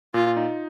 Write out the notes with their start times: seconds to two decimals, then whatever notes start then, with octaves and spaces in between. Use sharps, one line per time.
0.14 A#2 F4
0.37 D#4